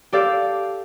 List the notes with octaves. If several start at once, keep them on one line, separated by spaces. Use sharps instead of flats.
G4 A4 D5 F5